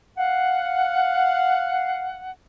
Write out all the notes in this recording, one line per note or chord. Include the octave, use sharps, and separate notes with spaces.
F5 F#5